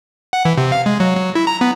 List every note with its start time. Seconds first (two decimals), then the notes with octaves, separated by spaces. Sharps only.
0.33 F#5
0.45 E3
0.58 C3
0.72 F5
0.86 G#3
1.00 F#3
1.17 F#3
1.35 E4
1.47 A#5
1.61 B3